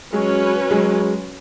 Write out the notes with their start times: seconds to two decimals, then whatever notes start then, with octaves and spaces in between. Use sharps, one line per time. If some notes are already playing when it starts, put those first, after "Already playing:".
0.12 F#3 G#3 C#4 F#4 B4
0.70 F#3 G#3